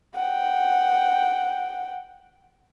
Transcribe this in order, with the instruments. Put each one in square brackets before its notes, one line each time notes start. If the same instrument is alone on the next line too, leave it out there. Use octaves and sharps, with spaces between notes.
[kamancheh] F#5 G5